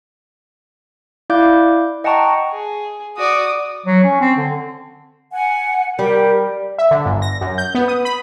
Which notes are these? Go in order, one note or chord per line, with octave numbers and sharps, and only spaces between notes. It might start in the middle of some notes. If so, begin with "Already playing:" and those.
E4 D5 F5 D6 G6
D#5 F#5 G5 A5 A#5 C#6
G#4
F#4 D5 D#6
F#3
C#4
C4
D3
F#5 G#5
G3 G4 A#4
E5
D3
G1
A#6
F#2
G6
B3
D#6
B5